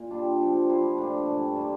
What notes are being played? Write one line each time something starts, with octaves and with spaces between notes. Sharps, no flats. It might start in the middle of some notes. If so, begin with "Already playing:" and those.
Already playing: A#2
G3 D4 F4
C3 F3 C4
F3 A#3 E4
A#2 A3 D4
G2 E3 G3
D3 G3 A#3 F4